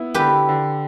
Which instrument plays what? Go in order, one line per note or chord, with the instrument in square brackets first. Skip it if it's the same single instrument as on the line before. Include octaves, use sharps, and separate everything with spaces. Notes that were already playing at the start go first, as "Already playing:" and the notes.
Already playing: [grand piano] B3 E4
[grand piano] D3 [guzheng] G4 B4
[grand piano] D3